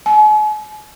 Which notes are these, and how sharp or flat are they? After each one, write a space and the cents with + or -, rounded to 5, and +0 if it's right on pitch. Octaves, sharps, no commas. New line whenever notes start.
G#5 +45